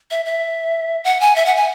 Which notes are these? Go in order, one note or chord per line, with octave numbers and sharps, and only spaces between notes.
E5
E5
F#5
G#5
E5
F#5
G#5